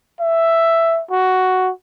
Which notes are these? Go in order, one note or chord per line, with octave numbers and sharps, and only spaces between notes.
E5
F#4